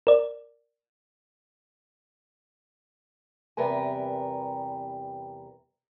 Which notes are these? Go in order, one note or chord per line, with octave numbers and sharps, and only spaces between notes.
A#4 D5
E2 C3 G3 A#4 B4 G#5